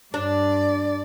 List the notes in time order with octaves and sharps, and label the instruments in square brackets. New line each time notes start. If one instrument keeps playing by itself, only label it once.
[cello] G2 D5 [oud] D4